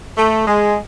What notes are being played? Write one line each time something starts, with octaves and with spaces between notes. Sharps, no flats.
A3
G#3